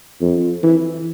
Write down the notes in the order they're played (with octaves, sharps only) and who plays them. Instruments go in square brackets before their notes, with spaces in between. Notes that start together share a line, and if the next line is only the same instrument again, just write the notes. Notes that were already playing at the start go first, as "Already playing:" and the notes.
[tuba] F2
E3